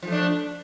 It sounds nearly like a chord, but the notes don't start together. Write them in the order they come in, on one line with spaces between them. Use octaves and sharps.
F3 A3 D4